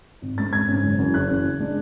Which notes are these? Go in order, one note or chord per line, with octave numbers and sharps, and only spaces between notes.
G#1
G#2 G#3 C#4 A6
G#1 G#6
G#2 G#3 C#4
F#1
F#2 E3
F#1 F#6
F#2 E3
F#1
C#3 G#3 D4